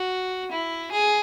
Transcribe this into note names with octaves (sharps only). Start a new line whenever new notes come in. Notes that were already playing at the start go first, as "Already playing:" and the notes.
Already playing: F#4
E4
G#4